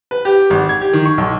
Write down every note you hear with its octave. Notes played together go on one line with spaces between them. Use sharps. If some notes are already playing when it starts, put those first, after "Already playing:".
B4
G4
G#1
G#6
G4
D#3
C#6
B1